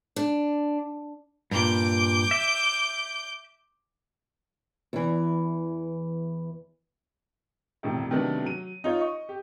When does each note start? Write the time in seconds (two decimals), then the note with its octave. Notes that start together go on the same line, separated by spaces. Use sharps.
0.16 D4
1.51 G2 A#2 D6 G6
2.31 E5
4.93 E2 E3
7.83 E1 D#2 A2 C3
8.10 C3 D#3 F#3 A3 B3 D4
8.44 F#3 D#7
8.84 D#4 F4 C#5
9.00 D#5 C#6
9.29 G4